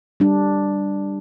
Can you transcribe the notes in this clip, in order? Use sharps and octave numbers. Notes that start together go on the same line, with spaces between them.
G3 D4